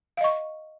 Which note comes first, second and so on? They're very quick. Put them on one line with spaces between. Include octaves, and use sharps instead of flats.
F5 D#5 C#6